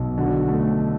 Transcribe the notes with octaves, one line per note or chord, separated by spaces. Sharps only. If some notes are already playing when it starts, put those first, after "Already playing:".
Already playing: B1
D3 F#4
A3